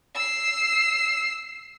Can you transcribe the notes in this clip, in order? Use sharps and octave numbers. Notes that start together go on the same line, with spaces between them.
E6 C7